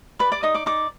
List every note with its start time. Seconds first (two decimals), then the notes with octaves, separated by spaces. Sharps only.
0.19 B4 D5 B5
0.32 D5 D6
0.43 D#4 D#5 D#6
0.54 D5 D6
0.66 D#4 D5 D6